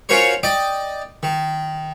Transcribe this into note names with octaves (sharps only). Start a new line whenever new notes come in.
C#4 F4 F#4 A#4 C5 C#5
D5 D#5 G5 D6
D#3